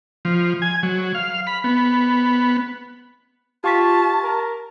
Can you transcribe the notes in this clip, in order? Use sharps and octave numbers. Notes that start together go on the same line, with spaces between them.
F3
G#5
F#3
F5
B5
B3
F4 G4 A5 C#6 B6
A#4